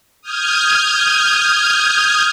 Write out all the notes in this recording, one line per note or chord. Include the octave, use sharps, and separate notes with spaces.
D#6 F6 G6 G#6